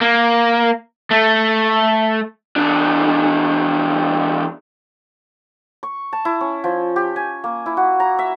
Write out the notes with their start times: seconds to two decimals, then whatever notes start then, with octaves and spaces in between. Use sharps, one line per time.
0.01 A#3
1.11 A3
2.56 E2 D4
5.83 C#6
6.13 A5
6.25 E4
6.41 C#4
6.64 F3
6.96 G4
7.16 G#5
7.44 A#3
7.66 E4
7.77 F#4
8.00 A#5
8.19 E5